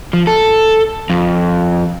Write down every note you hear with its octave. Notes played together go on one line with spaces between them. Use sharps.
F3
A4
F2